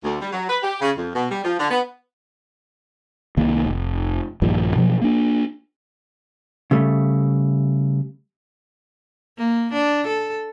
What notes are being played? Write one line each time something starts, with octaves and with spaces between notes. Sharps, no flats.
D2
G3
F#3
B4
G4
C#3
F2
B2
G3
F3
D3
B3
C2 D#3 A#3
F1
A#1 G2 D#3 F3
B2 F3 F#3
A#3 D4
C#3 G3 A3
A#3
D4
A4